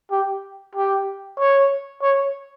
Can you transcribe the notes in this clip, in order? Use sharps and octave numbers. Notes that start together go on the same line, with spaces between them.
G4
G4
C#5
C#5